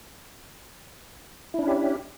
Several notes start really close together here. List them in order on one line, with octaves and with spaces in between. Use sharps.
E4 D4 C#4 G4